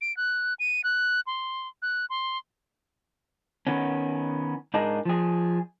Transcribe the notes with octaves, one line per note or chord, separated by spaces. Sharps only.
D7
F#6
D#7
F#6
C6
F#6
C6
D#3 B3 C#4
G#2 D4 D#4 G#4 A#4
F3 G#4